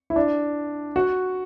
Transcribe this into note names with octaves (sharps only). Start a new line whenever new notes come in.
E4
D4
F#4